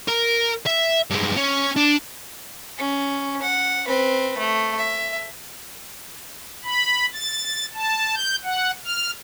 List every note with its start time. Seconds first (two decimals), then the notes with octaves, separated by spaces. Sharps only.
0.08 A#4
0.66 E5
1.11 G2 G#3
1.37 C#4
1.76 D4
2.78 C#4
3.42 F#5
3.87 C4 B4
4.38 A3
4.78 E5
6.64 B5
7.13 A6
7.74 A5
8.15 G6
8.44 F#5
8.84 F6